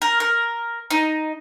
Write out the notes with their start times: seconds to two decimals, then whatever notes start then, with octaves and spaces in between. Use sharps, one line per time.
0.02 A#4
0.20 A#4
0.91 D#4